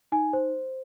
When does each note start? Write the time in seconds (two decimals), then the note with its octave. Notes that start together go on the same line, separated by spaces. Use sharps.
0.12 D#4 G#5
0.33 C5